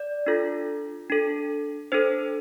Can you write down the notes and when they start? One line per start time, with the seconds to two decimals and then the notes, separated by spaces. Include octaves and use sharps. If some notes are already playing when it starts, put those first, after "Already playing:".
Already playing: D5
0.26 D4 F4 A4
1.10 D4 A4
1.92 D4 A4 C5